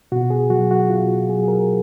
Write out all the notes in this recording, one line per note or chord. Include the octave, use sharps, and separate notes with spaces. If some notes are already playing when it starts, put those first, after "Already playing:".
B2 F#4
G#4
F#3 F#4
F#4
B2 F4
F#4
F#3 G#4
G#4
A#4